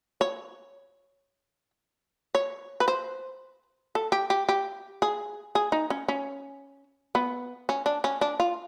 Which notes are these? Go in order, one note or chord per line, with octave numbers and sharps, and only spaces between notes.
C#5
C#5
B4
C5
A4
G4
G4
G4
G#4
G#4
D#4
C#4
C#4
B3
C#4
D4
C#4
D4
F4